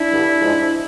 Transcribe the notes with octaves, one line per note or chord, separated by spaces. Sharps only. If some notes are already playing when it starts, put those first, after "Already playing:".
Already playing: D4 E4
G2 D3 G3
G#2 F3 G#3